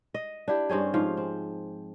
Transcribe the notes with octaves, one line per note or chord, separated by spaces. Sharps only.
D#5
D4 E4 G4
G2 C4 C#4 G#4
G#2 F3 F5
C4